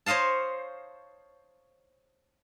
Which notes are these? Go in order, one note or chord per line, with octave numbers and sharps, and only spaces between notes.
C5 C#5 D#5 F5 A5